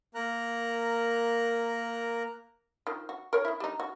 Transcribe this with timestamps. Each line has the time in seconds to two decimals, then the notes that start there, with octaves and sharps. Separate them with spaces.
0.15 A#3 A#4 A#5 F#6
2.87 D#3 F3
3.09 F#4
3.33 A#4 C#5
3.45 D#3 E4
3.60 G3 D#4
3.80 F#4